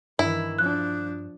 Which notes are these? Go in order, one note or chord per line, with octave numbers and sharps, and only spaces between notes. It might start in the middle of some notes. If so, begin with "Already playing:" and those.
G2 D#3 E3 E4
F3 D4 F#6